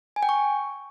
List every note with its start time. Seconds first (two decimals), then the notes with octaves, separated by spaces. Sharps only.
0.16 G#5
0.23 G5
0.29 C#6